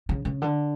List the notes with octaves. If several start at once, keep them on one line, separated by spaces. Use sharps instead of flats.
C#3
C#3
D3